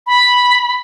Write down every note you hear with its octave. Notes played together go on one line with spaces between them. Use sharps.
B5